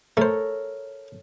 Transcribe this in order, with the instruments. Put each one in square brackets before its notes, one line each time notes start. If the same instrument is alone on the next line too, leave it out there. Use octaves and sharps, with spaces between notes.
[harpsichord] A3 C5 [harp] A4 A#4 C#5